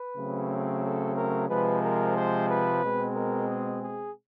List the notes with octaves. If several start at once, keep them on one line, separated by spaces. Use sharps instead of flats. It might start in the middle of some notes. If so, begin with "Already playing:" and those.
Already playing: B4
C#3 F#3 A3 C4
A4
A#4
C3 F3 G#3 B4
A#4
C5
B4
B2 G#3 C4
A#4
G#4
G#4